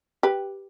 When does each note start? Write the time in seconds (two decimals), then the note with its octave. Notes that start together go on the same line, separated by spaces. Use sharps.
0.23 G4 B4